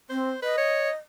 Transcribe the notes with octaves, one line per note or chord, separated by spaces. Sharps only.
C4 C5
B4 D#5
C#5